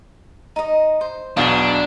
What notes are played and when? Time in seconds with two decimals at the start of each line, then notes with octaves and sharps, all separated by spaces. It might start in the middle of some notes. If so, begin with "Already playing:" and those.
0.56 D#4 D#5
1.01 C5
1.37 B1 E2 B2 D4 F4 F#4